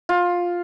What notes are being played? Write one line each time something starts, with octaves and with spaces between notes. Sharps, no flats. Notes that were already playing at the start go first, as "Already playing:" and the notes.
F4